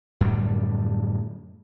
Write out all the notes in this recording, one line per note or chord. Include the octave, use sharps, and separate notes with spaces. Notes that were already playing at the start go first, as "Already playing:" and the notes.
F#2 A2 D3 G3